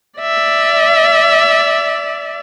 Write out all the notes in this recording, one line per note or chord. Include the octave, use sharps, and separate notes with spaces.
D5 E5